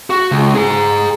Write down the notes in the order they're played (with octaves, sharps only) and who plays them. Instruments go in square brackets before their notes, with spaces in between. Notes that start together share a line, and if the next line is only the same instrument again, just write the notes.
[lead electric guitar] F#4
C#2
G#4 A#5